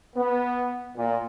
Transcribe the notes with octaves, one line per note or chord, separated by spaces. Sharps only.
B3
A#2